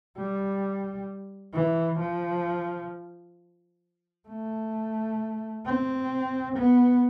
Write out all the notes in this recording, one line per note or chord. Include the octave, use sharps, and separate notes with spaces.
G3
E3
F3
A3
C4
B3